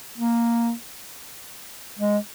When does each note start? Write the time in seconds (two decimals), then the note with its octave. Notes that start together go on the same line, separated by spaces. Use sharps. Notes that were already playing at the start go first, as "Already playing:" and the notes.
0.18 A#3
1.99 G#3